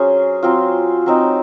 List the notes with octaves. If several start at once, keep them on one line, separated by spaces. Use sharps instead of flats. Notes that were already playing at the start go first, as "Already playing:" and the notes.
Already playing: F#3 C#4 G#4 C5
F#3 C4 F4
F#3 C4 D#4